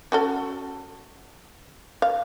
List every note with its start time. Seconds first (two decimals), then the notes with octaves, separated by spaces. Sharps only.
0.12 C#4 F#4 A4
2.02 F5